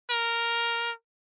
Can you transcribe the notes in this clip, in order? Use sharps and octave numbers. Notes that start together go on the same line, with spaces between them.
A#4